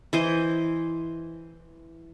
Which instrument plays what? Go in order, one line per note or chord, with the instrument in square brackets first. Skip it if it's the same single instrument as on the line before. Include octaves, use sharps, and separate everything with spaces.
[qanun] E3 C5 D#5